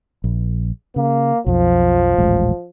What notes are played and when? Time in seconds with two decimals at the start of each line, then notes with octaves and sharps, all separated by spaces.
0.24 A#1
0.96 C#3 A#3
1.46 B1 F2 F3
2.18 D#1 A1 G#3